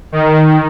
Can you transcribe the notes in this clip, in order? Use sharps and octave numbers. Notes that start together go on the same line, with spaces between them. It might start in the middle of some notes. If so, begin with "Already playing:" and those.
D#3